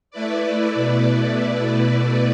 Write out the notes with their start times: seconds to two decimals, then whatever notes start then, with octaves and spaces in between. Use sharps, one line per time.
0.11 A3 E4 B4 D5
0.74 B2 A3 E4 B4 D5